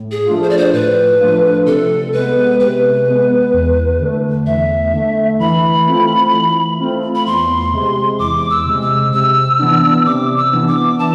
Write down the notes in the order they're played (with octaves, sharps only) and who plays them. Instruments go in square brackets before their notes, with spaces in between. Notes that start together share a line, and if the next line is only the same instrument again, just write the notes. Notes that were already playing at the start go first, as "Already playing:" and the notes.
Already playing: [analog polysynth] A2
[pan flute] G#4
[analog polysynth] F3 A3 D4 F4
[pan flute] C5
D5
C5
[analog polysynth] A2 [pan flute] B4
[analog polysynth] F3 A3 D4 F4
[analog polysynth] C3 [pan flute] A4
[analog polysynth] G#3 B3 [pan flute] B4
[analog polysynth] C3 [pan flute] B4
[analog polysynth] G#3 B3
E2
D3 A3
[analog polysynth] E2 [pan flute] E5
[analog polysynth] D3 A3
[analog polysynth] E3 [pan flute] B5
[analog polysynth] A3 C4 F4
E3
A3 C4 F4
[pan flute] B5
[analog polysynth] E2 [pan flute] C6
[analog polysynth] C3 G#3
[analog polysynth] E2 [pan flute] D6
[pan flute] E6
[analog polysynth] C3 G#3
[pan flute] E6
[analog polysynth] C3 [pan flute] E6
[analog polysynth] E3 B3 D4
[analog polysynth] C3 [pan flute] D6
[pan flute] E6
[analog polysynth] E3 B3 D4
[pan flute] D6
[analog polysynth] E3 [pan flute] A5